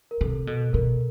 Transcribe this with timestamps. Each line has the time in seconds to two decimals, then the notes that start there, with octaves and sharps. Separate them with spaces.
0.11 A#4
0.21 C3 A4
0.47 B2 A4
0.73 B2 A#4